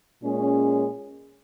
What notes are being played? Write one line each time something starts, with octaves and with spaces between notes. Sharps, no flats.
A#2 G#3 C#4 G#4